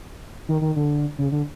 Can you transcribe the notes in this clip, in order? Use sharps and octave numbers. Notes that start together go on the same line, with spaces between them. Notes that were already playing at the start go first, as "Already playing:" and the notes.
D#3
D#3
D3
C#3
D3